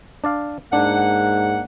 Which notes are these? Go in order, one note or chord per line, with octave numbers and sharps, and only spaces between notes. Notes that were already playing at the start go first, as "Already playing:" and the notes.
D4 D5 F5
G#2 A#3 D4 F#5